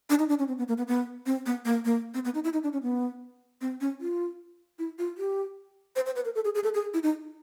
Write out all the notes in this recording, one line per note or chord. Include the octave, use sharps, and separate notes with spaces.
D4
D#4
D4
C#4
C4
B3
A#3
B3
B3
C4
B3
A#3
A#3
C4
B3
D#4
E4
D#4
D4
C#4
B3
C4
C#4
F4
E4
F4
G4
C5
C5
B4
A#4
A4
G#4
G#4
A4
G#4
E4
D#4